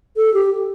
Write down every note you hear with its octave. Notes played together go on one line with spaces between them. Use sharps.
A4
G4